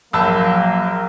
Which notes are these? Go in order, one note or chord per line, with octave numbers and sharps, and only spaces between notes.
A#1 F#3 A#3 A5 B5 E6